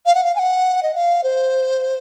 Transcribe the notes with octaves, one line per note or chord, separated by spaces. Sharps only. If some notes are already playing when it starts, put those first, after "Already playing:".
F5
F#5
F5
G#5
F#5
D#5
F5
C5